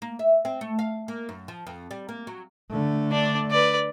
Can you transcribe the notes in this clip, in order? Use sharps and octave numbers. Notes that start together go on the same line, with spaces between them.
A#3
E5
C4
A3
F5
A#3
F#2
F3
F2
G3
A#3
F#3
D3 A3
D4 D5
B4 D5